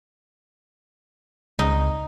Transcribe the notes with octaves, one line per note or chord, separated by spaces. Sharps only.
C#2 D#4